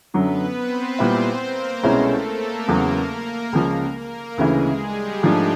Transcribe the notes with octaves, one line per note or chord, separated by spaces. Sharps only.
F#2 D3 F#3 B3 B4
C4 C5
A#2 G3 B3 E4
A#3 A#4
C2 B2 G#3 A3 C#4 E4 A4
A#3 A#4
E2 C#3 F#3
A#3 A#4
C#2 C#3 F3
A#3 A#4
D2 C#3 E3 G#3 G#4
G3 G4
G#2 F3 A3 D4